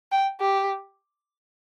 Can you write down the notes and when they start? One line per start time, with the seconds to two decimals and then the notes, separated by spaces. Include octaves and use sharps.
0.12 G5
0.41 G4